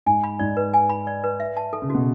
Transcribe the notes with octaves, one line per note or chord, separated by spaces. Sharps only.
G#2 G#5
B5
G#2 D5
B4
G#5
B5
D5
B4
E5
A5
A4
C#3
B2 F#4